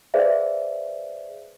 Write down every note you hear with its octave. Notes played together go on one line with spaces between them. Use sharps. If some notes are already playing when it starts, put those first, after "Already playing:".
G#4 B4 C5 D5 E5 F5